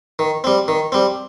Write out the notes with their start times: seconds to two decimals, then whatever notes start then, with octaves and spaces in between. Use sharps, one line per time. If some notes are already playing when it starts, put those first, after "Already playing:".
0.19 D#3
0.44 G3 C4
0.68 D#3
0.92 G3 C4